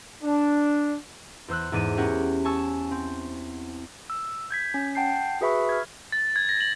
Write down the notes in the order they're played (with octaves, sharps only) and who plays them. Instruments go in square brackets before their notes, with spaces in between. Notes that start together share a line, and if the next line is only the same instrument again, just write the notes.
[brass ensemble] D4
[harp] E2 C5 E6 F#6
E2 G#2 D5 D#7
C#4 E4 G4 A#4 C#5 F#5
G#5 A5 C#6 E6
C4
[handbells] E6
G6 G#6 B6
C#4
F#5 G5 A5 G6 C7
F#4 G#4 B4 E5 B5 C#6
F6 G#6
[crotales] A6
G#6
A#6
F#7